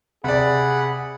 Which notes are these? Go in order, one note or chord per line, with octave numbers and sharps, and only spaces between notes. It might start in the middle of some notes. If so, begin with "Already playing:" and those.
C3 G#4 D5 F#5 B5